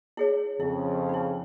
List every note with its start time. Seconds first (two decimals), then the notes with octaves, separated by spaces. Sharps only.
0.17 E4 G#4 C#5
0.60 F2 C#3 E4
1.09 D#4 E4